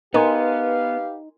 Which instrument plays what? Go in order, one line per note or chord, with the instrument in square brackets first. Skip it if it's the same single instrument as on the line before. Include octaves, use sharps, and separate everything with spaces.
[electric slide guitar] B3 [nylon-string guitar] D#4 [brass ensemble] G4 B4 F5 [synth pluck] A#4 G#5 C6